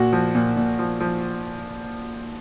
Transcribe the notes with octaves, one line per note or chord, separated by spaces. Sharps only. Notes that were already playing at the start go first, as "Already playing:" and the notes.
Already playing: A#2 F#4
F3
A#2
A#2
F3
F3